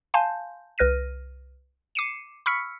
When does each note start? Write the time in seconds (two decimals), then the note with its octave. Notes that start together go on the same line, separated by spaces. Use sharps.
0.14 F5 G#5 A5 C6 G6
0.78 C2 B4 F6 A#6 D#7
1.95 D6 C7 C#7 D#7 E7
2.46 B5 C#6 E6 F6 B6 C#7